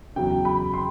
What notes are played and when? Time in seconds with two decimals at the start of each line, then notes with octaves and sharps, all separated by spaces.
0.16 E2 C#3 F#3 G5
0.45 B5
0.74 C6